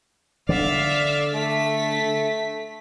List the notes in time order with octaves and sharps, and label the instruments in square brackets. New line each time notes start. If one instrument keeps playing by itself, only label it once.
[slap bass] D3 [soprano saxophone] D5 [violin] E5 F5
[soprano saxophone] A3 [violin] B6